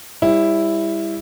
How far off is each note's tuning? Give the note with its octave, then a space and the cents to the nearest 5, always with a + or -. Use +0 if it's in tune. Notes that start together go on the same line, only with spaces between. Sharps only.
G3 +35 E4 +0 C#5 -45